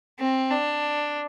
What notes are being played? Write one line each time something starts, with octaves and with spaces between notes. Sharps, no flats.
C4
D4